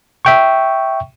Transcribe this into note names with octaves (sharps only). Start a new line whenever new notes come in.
E5 G5 C#6